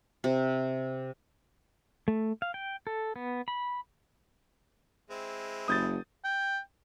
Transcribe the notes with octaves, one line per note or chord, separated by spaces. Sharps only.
C3
A3
F5
G5
A4
B3
B5
G#3 C4 E4
F#1 D#6 G6 A6
G5